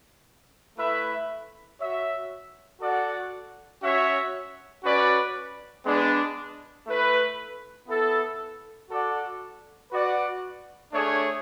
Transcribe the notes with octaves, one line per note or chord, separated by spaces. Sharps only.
A3 E4 B4 E5
F#4 C#5 E5
F#4 A4 D5 F#5
C#4 F#4 C#5 E5
C#4 F#4 B4 D5
G#3 B3 D4
A3 E4 B4
B3 E4 A4
F#4 A4 D5 F#5
F#4 B4 D5 F#5
A3 D4 G#4 C#5